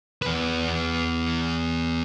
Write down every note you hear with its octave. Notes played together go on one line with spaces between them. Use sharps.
E2 B4